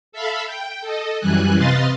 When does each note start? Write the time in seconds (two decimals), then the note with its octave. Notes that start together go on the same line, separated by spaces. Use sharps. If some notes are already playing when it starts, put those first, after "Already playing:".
0.12 A4 E5 F5 B5
0.46 G5
0.81 A4 D#5
1.20 F#2 E3 G3 G#5 F#6
1.57 C3 B4 D#5 F5 C6 A6